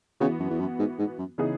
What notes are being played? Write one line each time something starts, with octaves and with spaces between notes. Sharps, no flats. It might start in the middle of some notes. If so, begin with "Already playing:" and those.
C#3 E3 B3 F#4
F#2
E2
F#2
G#2
G#2
F#2
C#3 E3 B3 D#4 G#4